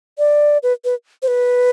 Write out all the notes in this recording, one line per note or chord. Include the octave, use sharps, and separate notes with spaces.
D5
B4
B4
C5
B4